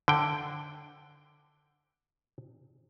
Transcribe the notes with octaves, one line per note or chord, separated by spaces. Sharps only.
D3 G5